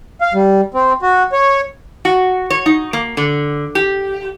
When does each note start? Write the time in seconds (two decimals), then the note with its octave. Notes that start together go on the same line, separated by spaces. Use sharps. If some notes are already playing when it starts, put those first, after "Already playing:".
0.21 F5
0.34 G3
0.74 C4
1.03 F#4
1.33 C#5
2.05 F#4
2.50 C#5
2.66 D#4
2.93 A#3
3.17 D3
3.75 G4